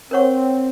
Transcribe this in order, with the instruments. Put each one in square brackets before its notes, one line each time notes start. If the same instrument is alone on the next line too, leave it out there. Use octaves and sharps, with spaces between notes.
[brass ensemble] C4 [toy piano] A#4 C#5 F#5 C#6